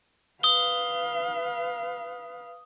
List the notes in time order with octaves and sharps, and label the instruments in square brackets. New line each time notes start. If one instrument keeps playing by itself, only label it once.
[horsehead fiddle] B4 F5 [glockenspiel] D#6 G7